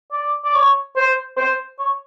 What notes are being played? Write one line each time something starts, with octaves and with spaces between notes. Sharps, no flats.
D5
D5
C#5
C5
C5
C#5